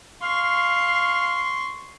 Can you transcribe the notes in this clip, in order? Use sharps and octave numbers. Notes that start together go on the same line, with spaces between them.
F5 C6 C#6